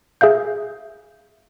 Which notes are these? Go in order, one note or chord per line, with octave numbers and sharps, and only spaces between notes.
G#4 E5 F5 G6